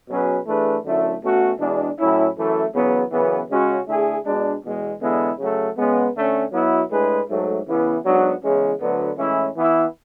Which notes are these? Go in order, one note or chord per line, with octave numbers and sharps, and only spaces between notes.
B2 F#3 C#4 G#4 B4
E3 A3 D4 G#4 B4
F#2 D3 A3 E4
B2 A3 C#4 F#4
E2 B2 G#3 D4
A2 F#3 C#4 E4
F#2 E3 A3
E2 C#3 F#3 B3
F#2 C#3 E3 B3
C#3 G#3 C#4 F#4
D3 A3 E4 G#4
B2 G#3 D4
E2 B2 G#3
E2 D3 G#3 B3 E4
C#3 F#3 A3
C#3 G#3 B3
D3 A3 C#4
B2 F#3 B3 E4
A2 G#3 D4 G#4 B4
G#2 F#3 A3
C#3 E3 B3 E4
G#2 F#3 B3 D4 F#4
E2 C#3 E3 G#3 C#4
D2 D3 F#3 B3
A2 E3 G#3 C#4 E4
E3 B3 E4